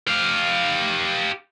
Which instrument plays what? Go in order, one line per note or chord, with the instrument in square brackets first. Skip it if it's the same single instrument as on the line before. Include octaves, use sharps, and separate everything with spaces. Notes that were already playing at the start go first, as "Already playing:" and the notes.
[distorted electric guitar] G4 F5